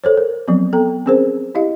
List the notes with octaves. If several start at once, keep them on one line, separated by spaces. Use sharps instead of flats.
A4 C5 C#5
A#4
F3 F#3 B3 C4
B3 A4 G5 A#5
C4 C#4 G#4 A#4 C5
E4 G4 D#5 F5